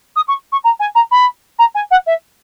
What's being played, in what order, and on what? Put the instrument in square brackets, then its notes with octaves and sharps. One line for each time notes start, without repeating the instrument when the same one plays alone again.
[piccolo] D#6
C#6
C#6
A#5
G#5
A#5
B5
A#5
G#5
F#5
E5